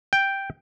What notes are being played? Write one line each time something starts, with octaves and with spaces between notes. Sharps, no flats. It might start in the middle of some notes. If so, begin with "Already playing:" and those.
G5